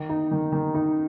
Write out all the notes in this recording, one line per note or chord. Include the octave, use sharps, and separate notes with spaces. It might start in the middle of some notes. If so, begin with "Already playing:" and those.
Already playing: D#3
D#4
D#3
D#3
D#4